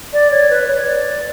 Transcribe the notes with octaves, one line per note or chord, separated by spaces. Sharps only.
D5
C#5
B4
C#5
D5